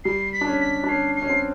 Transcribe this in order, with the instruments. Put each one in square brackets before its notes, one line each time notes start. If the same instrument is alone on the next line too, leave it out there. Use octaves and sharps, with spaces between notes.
[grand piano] G3 [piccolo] C7
[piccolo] B6
[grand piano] D4
C#4
[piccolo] B6
[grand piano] D4
[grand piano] C#4 [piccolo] C7
[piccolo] C7
[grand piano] C#4
C4